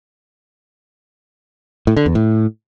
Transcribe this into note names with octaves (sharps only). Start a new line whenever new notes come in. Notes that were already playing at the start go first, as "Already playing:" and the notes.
A2
D3
E2
A2